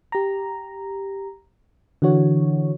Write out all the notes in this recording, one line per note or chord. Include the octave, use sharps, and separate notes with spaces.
G4 A#5
D3 E3 F#4 C#5